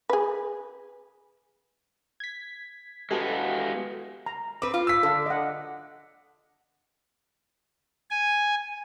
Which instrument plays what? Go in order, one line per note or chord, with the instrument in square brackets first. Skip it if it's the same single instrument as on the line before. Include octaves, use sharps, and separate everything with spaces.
[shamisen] G#4 B4
[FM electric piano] G#6 B6
[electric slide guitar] G#3 B3 [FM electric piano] F#4 G4 A4
[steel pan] A#5
[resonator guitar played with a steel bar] C4 B4 [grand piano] D6
[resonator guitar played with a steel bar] F4
[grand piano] E6 B6
[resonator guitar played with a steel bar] D3 [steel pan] A4 F5
[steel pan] D#5 F#5
[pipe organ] G#5